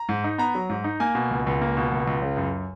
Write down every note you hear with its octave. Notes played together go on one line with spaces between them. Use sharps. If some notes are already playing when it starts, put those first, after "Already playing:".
Already playing: A#5
G#2
D#4
B3 A#5
F#3
G#2
D#4
A#3 G#5
B2
C#2
C#2
A#3
B2
C#2
C#2
C#3
F#2